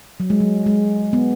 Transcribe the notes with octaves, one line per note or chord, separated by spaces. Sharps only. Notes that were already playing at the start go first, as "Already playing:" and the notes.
F#3
G#3
F#3
G#3
B3